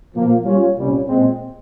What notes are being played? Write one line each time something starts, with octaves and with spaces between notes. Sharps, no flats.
A#2 F3 A#3
G3 C#4 F4
C2 A#2 G3 C#4
A#2 G#3 C4